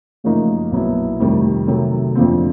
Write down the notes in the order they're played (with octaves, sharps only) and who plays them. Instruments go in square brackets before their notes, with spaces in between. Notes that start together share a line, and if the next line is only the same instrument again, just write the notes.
[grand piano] F#2 C#3 F3 A#3 D#4 [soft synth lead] A3
[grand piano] B1 A#2 F#3 B3 E4
[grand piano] F2 C3 D#3 G3 [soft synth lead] A3
[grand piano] C3 D#3 F#3 A3 C4
[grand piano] F2 D3 F3 A3 C4 [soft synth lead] A#3